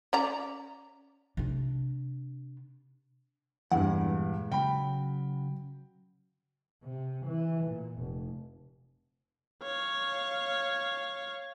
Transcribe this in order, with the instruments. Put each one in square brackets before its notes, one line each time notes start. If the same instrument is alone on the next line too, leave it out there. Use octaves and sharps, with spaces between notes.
[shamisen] C#4 D5 A#5
[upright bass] C3 D4
[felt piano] E2 G2 [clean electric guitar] A#2 G#3 F#5
[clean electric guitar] C#3 F#3 B5 [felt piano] G5
[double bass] C3
E3
A#2
F1
[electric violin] C#5 F5